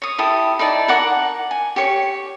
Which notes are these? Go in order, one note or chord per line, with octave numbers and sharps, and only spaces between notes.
C#5 D#6
E4 G4 A4 D#6
D#4 E4 D5 A5
A#4 F#5 D6
G#5
G4 C#5 C#6